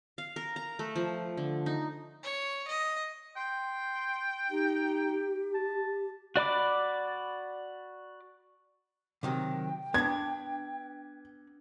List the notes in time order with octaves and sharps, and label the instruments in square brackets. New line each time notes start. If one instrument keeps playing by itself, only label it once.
[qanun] F5
A#4
A#5
A3
F3
D3
D#4
[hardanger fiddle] C#5
D#5
[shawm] G5 [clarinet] C6
[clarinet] D#4 [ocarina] G4
[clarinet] A5
[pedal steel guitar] F#4 D5 B5 D6
[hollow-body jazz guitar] C3 D#3 F#3 [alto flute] G5
[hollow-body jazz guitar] B3 D4 [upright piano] G#6